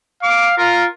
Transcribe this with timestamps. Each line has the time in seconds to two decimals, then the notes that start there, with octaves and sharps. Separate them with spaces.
0.23 F5 D6
0.58 F4 A#4